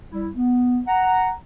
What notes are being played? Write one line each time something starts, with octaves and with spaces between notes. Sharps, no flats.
G3 E4
B3
F#5 A#5